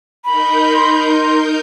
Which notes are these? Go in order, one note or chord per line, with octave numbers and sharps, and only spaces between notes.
D#4 A#4 B5 G6
C6